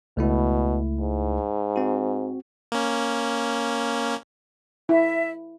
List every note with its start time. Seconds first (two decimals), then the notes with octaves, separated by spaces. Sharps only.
0.17 C#2 B2 A3 E4
1.00 G#2
1.76 C4 F#4
2.72 A#3 C#4
4.89 E4 E5